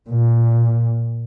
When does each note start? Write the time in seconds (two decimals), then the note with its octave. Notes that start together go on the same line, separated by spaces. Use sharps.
0.10 A#2